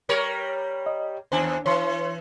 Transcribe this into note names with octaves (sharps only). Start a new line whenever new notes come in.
G3 A#4 C#5
D#5
D#2 D4 C5 G#5
E3 C#5 C6